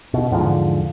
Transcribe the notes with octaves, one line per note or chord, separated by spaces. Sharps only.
B2
E2 G#2 D3 F3